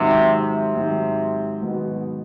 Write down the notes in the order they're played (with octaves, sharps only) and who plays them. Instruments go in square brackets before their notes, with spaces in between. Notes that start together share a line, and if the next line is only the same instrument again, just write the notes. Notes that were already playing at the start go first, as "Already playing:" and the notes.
Already playing: [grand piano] G#2 D#3 F#3 [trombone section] C3
[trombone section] C3
[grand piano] G#2 D#3 F#3
[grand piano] G#2 D#3 F#3 [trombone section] B2